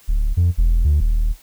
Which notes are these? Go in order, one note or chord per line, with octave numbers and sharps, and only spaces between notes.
D1
F2
E1
D2
D#1